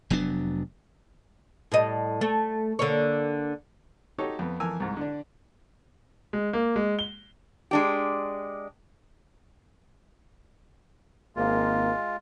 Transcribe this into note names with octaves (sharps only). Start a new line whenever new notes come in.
F1 F#3 B3 D4
A2 G3 D#5
A3
D3 A#3 C#5
D#4 F#4 G4 A4 C#5
F2 B3
F2 E3 A#4 G#5 A5 E6
C2 G#2
D3 D4
G#3
A#3
G#3
G7
G#3 D4 G4
G#1 G#3 A#3 F4